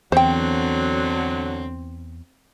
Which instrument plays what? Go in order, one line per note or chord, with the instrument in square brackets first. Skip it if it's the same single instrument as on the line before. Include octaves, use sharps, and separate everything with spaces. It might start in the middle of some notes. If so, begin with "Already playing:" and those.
[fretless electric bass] E2 [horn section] D3 F#3 [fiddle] C4 [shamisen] C5 G5